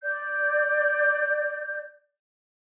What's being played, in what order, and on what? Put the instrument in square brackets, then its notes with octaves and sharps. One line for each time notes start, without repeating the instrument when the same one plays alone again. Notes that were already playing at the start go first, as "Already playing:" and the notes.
[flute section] D5 G6